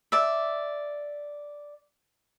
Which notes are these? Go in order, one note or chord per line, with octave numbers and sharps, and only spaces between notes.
D5 E5